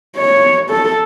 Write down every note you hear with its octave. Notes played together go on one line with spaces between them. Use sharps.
C#5
A4